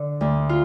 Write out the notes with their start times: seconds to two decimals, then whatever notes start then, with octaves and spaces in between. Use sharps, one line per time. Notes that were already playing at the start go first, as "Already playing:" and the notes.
Already playing: D3 D4
0.21 D2
0.49 F4